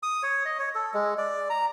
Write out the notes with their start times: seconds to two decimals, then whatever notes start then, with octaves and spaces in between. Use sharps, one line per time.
0.03 D#6
0.23 C#5
0.45 D#5
0.59 C#5
0.75 A4
0.94 G#3
1.18 D5
1.50 A#5